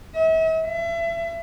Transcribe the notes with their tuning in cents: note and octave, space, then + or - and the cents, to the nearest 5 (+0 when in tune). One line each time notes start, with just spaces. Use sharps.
E5 -40
E5 +30